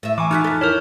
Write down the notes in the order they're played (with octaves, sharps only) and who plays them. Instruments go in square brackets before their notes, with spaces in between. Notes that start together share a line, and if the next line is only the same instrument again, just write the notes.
[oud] A2 E5
[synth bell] E3 [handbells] G#5 C#6 D6
[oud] D#3 F#4 A4 [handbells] D#4 [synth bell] F6 F#6 B6
[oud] F2 A4
[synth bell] E4 A#4 [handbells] C#5 F6 G6